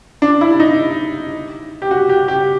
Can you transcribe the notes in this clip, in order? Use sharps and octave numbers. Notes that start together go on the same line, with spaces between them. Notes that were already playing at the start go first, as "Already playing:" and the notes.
D4
E4
D#4
G4
F#4
G4
G4